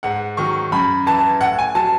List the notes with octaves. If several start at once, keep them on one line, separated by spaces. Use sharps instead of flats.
G#2 F#5
D#3 F#3 C#6
F#2 B5
E3 A5
A2 F#5
G#5
F#3 A5